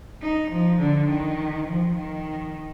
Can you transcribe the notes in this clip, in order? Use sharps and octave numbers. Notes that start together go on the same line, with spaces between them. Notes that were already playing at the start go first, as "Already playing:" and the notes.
D#4
F3
D3
D#3
F3
D#3